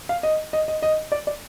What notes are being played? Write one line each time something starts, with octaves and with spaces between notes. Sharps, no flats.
F5
D#5
D#5
D#5
D#5
D5
D5